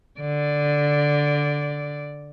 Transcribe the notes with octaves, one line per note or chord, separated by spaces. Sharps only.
D3 D5